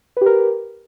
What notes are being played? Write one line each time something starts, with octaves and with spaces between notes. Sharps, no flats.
G4 A#4 B4